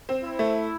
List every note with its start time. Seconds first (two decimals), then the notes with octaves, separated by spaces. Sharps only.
0.09 C4
0.24 E4
0.39 A3